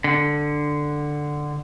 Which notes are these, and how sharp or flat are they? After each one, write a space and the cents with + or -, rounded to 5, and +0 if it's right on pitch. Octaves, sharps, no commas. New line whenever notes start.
D3 +5